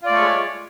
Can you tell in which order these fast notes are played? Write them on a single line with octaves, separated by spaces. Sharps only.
F4 D5 A3 C#5 G#3